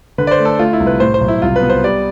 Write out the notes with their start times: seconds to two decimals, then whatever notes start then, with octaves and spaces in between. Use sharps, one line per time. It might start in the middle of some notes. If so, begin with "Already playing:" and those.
0.18 D3 B4
0.27 D5
0.31 C5
0.39 A3
0.45 A4
0.59 A3 F4
0.73 E4
0.80 C2
0.87 B4
1.00 A2 C5
1.14 C5
1.21 B1
1.28 E4
1.42 C2 F4
1.56 B4
1.62 B3
1.70 C5
1.84 G3 D5